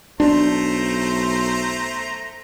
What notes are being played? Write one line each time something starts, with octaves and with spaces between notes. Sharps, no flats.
B1 A3 D4 C5 A#5